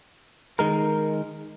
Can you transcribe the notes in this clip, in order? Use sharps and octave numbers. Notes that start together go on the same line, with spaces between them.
D#3 G#3 A#4